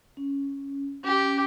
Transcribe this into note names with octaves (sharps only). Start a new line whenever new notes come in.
C#4
C#4 G4